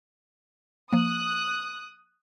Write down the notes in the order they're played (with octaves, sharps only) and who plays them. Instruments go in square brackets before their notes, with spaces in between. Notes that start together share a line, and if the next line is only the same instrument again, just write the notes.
[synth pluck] F3 A#3 [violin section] D#6 F#6